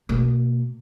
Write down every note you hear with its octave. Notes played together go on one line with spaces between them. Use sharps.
B2 A#3